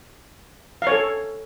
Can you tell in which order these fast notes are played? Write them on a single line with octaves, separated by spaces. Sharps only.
F5 C#5 A4